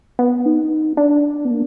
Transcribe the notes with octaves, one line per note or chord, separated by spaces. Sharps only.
B3
D#4
D4
B3
A#3